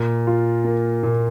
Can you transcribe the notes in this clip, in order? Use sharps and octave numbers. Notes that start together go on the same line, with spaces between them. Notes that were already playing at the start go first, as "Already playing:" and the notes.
Already playing: A#2
F4
A#3
A#2